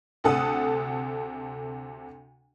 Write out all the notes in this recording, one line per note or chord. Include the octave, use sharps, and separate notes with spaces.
D2 C3 A4 F#5 D#6